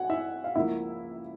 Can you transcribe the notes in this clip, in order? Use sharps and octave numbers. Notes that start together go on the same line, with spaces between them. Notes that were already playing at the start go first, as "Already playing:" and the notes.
Already playing: F#4 F#5 G#5
E4 E5
F5
C#2 C#3 F3 A#3 E4 E5